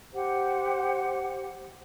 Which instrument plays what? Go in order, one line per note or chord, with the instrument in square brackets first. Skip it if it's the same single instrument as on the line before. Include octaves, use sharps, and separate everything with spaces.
[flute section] G4 C5 F#5